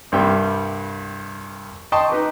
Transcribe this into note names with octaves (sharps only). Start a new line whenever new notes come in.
C2 G2 G3 E5 G5
D#5 G5 A5 C6 C#6 D#6
D#4 B4 D6